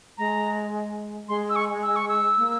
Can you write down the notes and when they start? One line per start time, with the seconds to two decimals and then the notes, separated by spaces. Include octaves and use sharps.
0.18 G#3 A#5
1.28 G#3 C6
1.50 E6
1.56 C#6
1.83 E6
1.96 C#6
2.08 E6
2.37 A#3